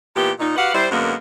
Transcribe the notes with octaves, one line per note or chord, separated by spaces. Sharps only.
A#2 E3 B3 G4
A#2 D#4
F#4 G4 B4 F5 F#5
G3 E4 C5
F#2 D3 G#3 A#3 B3